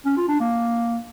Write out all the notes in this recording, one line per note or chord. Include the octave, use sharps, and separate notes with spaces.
C#4
F4
D4
A#3